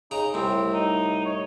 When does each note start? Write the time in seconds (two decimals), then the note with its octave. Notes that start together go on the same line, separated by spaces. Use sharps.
0.11 C#3 D#4 A#5
0.34 C2 A2 C4
0.73 D#4
1.25 C#5